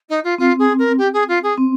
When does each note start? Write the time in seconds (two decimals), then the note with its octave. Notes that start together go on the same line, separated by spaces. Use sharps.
0.09 D#4
0.23 F4
0.38 C4 F4
0.58 G#4
0.78 A#4
0.98 G4
1.13 G#4
1.28 F4
1.43 G#4
1.57 C4